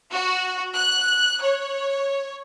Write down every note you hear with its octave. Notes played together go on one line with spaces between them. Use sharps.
F#4
F#6
C#5